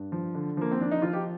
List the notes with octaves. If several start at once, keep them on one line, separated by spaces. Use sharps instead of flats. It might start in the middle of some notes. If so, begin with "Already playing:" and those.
Already playing: G2
F3
D3
F3 A#3
C4
F3 D4
D#4
F3 F4
G4